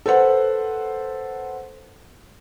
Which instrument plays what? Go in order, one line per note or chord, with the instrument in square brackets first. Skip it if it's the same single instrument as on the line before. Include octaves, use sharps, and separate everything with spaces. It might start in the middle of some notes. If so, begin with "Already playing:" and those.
[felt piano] A4 B4 C5 F#5